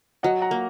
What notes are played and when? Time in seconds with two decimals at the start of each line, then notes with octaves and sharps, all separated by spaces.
0.23 F#3 D#5 F#5
0.42 F#5 A#5
0.51 A#3